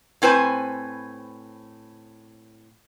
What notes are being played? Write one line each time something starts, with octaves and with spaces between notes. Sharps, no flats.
A2 C4 B4 C5 G#5